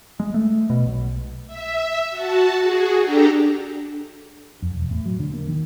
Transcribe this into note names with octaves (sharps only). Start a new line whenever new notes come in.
G#3
A3
B2
B1
E5
F#4 A5
F#4 G#4
D4 G4 A4 A#5
F2
E1
A2
F#3
D3
A#3
D#3